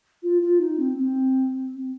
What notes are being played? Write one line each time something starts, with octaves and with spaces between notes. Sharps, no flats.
F4
F4
D#4
C4
C4